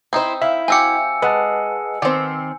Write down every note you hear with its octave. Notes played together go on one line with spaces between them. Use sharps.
C4 D#4 E4 C5
E4 E5 F5
C4 F#4 G4 G#5 E6 C#7
G#3 B4 F#5 A5
D#3 C4 G4